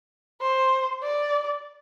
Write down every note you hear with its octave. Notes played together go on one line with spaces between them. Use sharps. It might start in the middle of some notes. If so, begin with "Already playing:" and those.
C5
D5